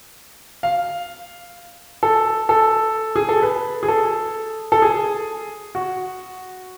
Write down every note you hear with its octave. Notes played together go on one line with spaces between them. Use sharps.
F5
A4
A4
G#4
A4
B4
G#4
A4
A4
G#4
F#4